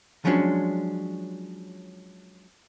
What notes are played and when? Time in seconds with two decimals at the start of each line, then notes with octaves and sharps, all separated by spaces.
0.25 F3 F#3 G#3 C#4 D4